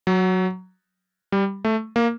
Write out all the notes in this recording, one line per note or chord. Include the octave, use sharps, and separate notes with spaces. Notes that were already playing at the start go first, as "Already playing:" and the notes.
F#3
G3
A3
A#3